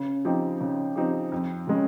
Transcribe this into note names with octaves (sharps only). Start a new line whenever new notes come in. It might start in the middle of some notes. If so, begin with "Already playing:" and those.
Already playing: C#3
F3 C4 D#4 G4
C#3
F3 C4 D#4 G4
F2
C#3 G#3 C#4